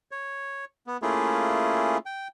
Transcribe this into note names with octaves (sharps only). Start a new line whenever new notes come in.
C#5
B3
A3 A#3 C#4 E4 F4 G#4
G5